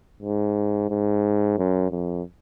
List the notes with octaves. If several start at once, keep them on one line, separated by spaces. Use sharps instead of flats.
G#2
G#2
F#2
F2